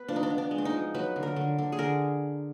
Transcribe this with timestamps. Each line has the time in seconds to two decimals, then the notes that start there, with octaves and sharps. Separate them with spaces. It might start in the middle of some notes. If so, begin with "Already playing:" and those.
Already playing: B3 B4
0.08 F3 D4
0.16 D#4
0.23 D4
0.30 B3
0.38 D4
0.51 G#3
0.58 D4
0.65 D#4
0.73 F3
0.95 F#3 B4
1.16 D3
1.23 A#4
1.36 D3
1.58 D3
1.72 G#4
1.79 D3 A#4